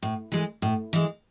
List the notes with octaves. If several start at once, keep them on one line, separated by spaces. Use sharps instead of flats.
A2
E3 G#3
A2
E3 G#3